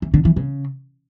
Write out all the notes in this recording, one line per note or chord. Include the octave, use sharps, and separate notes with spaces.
E3
D3
E3
C#3